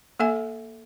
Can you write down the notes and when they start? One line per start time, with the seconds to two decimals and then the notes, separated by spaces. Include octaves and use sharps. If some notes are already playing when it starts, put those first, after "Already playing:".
0.20 A#3 A4 E5 G#5